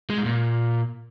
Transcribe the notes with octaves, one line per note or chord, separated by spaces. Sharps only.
G#3
G#2
A#2